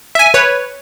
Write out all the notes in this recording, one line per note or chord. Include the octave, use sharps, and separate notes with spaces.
E5 G#5
B4 C#5